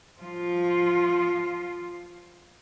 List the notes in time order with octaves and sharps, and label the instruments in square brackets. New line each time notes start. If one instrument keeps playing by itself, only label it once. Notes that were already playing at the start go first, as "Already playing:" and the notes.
[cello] F3 F4